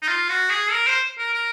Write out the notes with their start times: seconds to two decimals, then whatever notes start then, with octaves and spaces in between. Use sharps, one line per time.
0.02 D#4
0.08 F4
0.29 F#4
0.50 G#4
0.71 A#4
0.87 C5
1.18 A#4
1.34 A#4